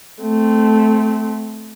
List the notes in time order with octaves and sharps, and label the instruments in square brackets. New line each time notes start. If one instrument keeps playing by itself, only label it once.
[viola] A3 C4